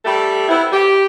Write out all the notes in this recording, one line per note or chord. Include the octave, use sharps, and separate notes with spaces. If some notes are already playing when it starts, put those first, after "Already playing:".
G3 A3 G4 A4
B3 C4 E4
G4